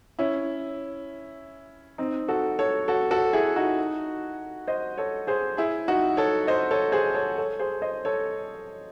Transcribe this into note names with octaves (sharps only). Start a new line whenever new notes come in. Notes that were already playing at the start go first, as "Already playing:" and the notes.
C#4 E4
C4 D#4
F#4 A4
A4 C#5
F#4 A4
F#4 A4
E4 G#4
D#4 F#4
C5 D#5
A4 C#5
G#4 C5
E4 G#4
D#4 F#4
A4 C#5
C5 D#5
A4 C#5
G#4 C5
A4 C#5
A4 C#5
G#4 C5
C5 D#5
A4 C#5